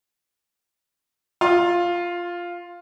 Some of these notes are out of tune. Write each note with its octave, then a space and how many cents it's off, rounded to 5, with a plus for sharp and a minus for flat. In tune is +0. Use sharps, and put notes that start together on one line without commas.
F4 +0 C6 +25